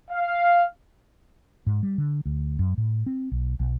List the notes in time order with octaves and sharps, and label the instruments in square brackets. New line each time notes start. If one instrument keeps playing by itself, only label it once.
[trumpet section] F5
[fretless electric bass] G#2
G3
D3
D2
F#2
A2
C4
B1
B1